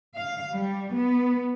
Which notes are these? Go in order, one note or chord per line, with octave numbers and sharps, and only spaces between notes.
F5
G3
B3